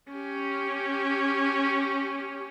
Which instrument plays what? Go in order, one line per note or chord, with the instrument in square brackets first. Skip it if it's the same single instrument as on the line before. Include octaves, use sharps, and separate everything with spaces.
[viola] C#4 G4